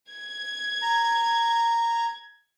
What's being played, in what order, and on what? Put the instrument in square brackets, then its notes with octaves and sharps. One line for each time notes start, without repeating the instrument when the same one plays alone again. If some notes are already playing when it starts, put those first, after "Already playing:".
[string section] G#6
[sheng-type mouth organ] A#5